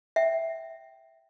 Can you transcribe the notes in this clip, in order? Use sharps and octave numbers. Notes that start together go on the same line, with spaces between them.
E5 G5